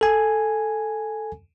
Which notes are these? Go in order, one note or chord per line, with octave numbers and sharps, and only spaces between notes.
A4 G#5